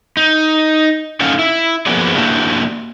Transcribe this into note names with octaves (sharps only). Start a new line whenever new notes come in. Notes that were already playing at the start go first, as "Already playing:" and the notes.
D#4
A3 C#4 D#4 F5 F#5
E4
F3 A#3 B3 F#4 G#4 D5
A#3 D4 E4 F#4 G4 A5